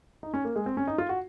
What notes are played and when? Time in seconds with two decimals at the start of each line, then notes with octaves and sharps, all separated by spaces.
0.23 D#4
0.34 C#4
0.44 A#3
0.56 G#3
0.66 C4
0.77 C#4
0.87 D#4
0.98 F4
1.09 F#4